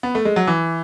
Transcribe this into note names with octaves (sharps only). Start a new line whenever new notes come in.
B3
A3
G#3
F#3
E3